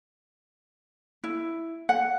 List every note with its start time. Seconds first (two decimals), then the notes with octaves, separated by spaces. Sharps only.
1.24 E4
1.89 F#5